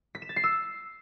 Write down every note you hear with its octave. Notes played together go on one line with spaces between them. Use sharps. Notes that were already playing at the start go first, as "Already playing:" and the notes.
B6
E7
A6
C7
E6